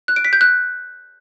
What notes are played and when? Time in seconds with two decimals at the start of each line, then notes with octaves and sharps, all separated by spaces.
0.08 F#6
0.16 D7
0.25 B6
0.33 G6
0.41 F#6